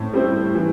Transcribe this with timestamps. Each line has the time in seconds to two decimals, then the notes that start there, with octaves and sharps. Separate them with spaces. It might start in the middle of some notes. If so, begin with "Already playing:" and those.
Already playing: A2 C4
0.14 G3 C4 E4
0.55 E3